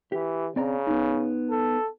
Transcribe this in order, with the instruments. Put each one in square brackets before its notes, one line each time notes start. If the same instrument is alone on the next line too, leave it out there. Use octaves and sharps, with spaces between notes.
[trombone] E3 [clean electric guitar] G4
[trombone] C#3 [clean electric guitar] C4 D5 A#5
[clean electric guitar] B3 D#4
[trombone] A4